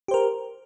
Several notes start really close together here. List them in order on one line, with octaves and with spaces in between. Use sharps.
G4 C5 A#4